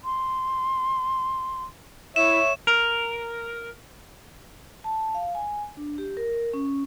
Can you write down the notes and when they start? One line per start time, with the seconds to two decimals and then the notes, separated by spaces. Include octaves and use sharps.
0.04 C6
2.16 E4 C#5 E5 E7
2.67 A#4
4.84 A5
5.15 F5
5.35 G#5
5.77 D4
5.98 G4
6.17 A#4
6.53 C#4